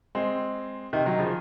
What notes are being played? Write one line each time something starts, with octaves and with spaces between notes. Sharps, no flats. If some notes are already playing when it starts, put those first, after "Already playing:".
G#3 C4
C3 D#3
D#3 F#3
C#3 F3